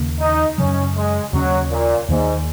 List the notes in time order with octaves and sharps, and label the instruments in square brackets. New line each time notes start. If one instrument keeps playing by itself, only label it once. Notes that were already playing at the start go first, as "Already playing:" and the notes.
Already playing: [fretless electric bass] D#2 C#3 A#3
[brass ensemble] D#4
[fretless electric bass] F#2 C#3 F#3 [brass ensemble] C#4
[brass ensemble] G#3
[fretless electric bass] D#2 C#3 A#3 C#4 [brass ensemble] F#3
[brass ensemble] A#2
[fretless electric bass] D#2 D#3 F#3 A#3 [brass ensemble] G#2